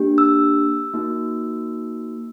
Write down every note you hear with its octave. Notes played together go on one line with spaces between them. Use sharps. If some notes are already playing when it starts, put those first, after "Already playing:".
Already playing: A#3 D4 G4
E6
A#3 D#4 F#4